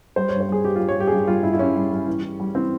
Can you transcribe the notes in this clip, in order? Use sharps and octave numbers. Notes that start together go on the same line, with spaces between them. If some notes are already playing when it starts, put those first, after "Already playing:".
G3 C5
G2 C#5
C5
G3 G#4
G2 G4
G3 F4
C#5
G3 G4
G#4
G2 G4
G3 F4
G2 E4
E4
G3 C#4
G3
G3
E3
E3
G3
E3 C4